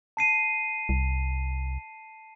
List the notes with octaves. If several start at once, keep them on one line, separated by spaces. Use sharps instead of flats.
A5 C7 D#7
C2